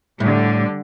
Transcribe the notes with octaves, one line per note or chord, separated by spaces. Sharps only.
A2 D3 G3